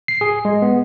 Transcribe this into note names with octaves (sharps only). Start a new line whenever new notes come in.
C7
G#4
G#3
B3